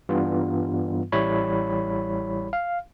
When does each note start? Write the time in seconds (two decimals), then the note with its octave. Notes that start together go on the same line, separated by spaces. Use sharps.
0.09 G2 E3 G3 B3 F4
1.12 A1 G3 E4 C#5 B5
2.53 F5